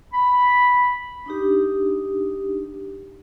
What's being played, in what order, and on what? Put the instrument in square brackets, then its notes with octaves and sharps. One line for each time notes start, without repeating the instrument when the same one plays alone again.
[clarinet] B5
[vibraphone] D4 D#4 G4